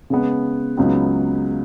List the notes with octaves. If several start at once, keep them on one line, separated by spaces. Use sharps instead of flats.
C#3 G#3 B3
C#2 C#3 F#3 B3 D#4